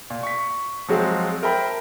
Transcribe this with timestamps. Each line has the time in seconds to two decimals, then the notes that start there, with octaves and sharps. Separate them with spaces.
0.10 A#2
0.23 C#6 B6
0.88 F3 F#3 G#3 C4 F5
1.43 A#4 C5 E5 G5 A5 B5